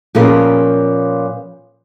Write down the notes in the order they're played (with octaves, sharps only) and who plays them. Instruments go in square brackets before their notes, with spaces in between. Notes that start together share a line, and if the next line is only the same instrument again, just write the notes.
[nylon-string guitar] A#2 F3 B3 C#4 G#4 A#4